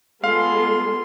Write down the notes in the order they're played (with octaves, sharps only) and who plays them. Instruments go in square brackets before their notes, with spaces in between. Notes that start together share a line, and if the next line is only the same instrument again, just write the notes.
[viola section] G#3 B3 A4 [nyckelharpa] F4 C6 [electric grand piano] F5